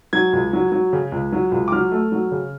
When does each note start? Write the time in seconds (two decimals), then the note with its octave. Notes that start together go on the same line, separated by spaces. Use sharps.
0.13 F#3 G#6
0.33 C#2
0.53 F#3
0.72 F#3
0.93 C#3
1.12 C#2
1.32 F#3
1.52 C#2
1.68 D6
1.72 F#3 F6
1.92 A3
2.12 F#3
2.32 C#3